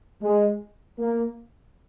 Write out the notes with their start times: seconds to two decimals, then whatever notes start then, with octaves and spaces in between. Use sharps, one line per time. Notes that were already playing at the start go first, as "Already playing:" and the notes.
0.22 G#3
0.99 A#3